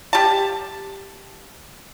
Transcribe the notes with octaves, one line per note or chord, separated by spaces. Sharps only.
G4 A5